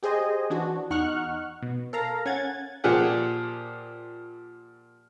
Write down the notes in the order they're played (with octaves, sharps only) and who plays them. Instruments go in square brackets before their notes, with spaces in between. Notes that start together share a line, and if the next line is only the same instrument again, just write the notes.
[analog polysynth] G4 G#4 C5 D#5 G#5
E3 D4 F#4
E2 D#4 F#5 C#6 F6 F#6
B2
A4 A#4 F5 A#5
C#4 F#5 G#5 G#6 A6
[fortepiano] A#2 F3 G4 G#4 F#5